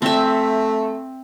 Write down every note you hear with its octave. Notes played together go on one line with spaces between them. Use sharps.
A3 C4 E5